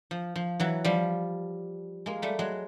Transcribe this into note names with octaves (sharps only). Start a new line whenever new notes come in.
F3
F3
E3 F#3
F3 G3
G#3 A#3
G3 A3
F#3 G#3